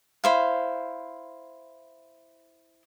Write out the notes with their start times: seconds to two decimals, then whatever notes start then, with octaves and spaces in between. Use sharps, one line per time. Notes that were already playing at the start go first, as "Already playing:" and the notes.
0.24 E4 C5 F5